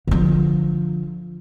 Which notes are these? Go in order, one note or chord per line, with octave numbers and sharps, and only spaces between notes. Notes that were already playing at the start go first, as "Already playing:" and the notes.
D3 F3